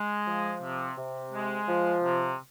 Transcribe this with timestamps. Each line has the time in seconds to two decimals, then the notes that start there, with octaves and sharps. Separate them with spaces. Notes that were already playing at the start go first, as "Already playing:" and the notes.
Already playing: G#3
0.26 F3
0.62 C3
0.96 C3
1.32 G#3
1.67 F3
2.02 C3